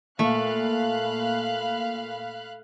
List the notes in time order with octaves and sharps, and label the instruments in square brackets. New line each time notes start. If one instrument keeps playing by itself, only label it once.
[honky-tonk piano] A#2 [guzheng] A3 [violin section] F5 B5 F#6